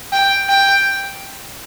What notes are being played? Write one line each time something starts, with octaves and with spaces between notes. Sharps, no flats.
G5
G5